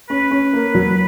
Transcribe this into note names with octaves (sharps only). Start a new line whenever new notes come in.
C#4 B4
C#4
A#3
F#3